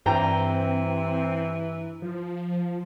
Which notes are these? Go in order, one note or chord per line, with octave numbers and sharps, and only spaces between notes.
G2 E3 C4 G5 A#5
F3